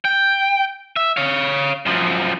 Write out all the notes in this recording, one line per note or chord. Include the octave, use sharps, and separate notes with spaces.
G5
E5
C#5 F5
F#2 F3